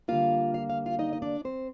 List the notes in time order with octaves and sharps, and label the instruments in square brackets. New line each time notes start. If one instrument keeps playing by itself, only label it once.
[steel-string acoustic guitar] D3 G3 A#3 F4 F5
F5
F5
F4 F5
D#4 D#5
D#5
D4 D5
C4 C5